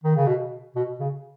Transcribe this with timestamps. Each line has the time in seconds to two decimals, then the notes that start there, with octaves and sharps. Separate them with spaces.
0.04 D#3
0.16 C#3
0.27 B2
0.76 B2
1.00 C#3